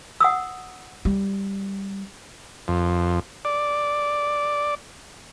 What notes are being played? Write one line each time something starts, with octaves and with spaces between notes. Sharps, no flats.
F#5 D#6 E6
G3
F2
D5